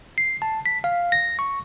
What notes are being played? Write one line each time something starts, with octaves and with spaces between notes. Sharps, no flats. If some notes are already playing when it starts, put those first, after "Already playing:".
C7
A5
B6
F5
A#6
C#6